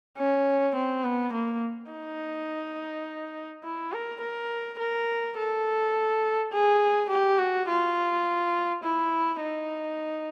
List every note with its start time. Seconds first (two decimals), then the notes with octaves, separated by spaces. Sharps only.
0.18 C#4
0.75 C4
1.04 B3
1.33 A#3
1.91 D#4
3.64 E4
3.92 A#4
4.21 A#4
4.79 A#4
5.37 A4
6.53 G#4
7.10 G4
7.39 F#4
7.68 F4
8.83 E4
9.41 D#4